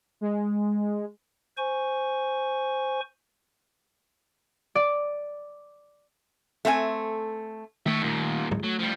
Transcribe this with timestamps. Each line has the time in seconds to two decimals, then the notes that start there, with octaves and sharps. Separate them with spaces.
0.21 G#3
1.57 C5 G#5 C#6
4.75 D5
6.65 A3 C4 F5 G#5
7.86 D#3 A3 C#5 E5
8.02 D#2 A#2
8.51 D1 G#2 F#3
8.64 F#3 A3
8.79 F3 G3